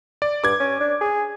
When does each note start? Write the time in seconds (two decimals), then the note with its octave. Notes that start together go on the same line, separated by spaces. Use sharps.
0.22 D5
0.44 G2 D6 G#6
0.60 C#4
0.80 D4
1.01 G#4